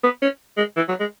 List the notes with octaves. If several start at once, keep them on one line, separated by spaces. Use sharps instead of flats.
B3
C#4
G#3
E3
F#3
G#3